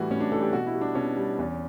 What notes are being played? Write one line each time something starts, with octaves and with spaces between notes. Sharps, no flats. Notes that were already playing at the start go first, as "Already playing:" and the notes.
Already playing: A2 E3 G3 F#4
A2 C#4
D4
E3 G3 A4
G4
B2 F#4
E4
G3
D4
B2 C#4
G3
E2